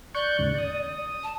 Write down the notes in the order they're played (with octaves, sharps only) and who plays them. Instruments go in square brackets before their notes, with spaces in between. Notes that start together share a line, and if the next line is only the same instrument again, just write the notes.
[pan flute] D5 [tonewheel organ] C#6 F#6 G6
[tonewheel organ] D#2 G#2 C#3
D#6
[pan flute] A5